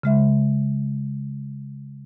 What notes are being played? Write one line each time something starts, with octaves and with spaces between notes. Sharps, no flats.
C#3 G#3 E5